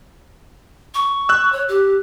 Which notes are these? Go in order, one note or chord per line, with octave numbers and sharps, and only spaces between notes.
C#6
E6 F#6
C#5
G4